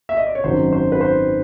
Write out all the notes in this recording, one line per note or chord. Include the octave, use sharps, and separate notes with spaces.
E5
D#5
D5
C#5
G#1 F#2 D#3 F#3 C5
C5
B4
C5